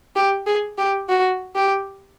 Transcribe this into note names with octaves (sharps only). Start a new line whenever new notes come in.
G4
G#4
G4
F#4
G4